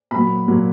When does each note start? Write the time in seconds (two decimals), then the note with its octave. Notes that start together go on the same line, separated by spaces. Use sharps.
0.11 A#2 F#3 B5
0.48 A#2 F#3